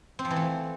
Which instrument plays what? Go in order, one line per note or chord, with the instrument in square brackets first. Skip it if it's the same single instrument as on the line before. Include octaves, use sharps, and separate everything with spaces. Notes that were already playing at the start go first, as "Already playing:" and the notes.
[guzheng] C4
F3
E3
A3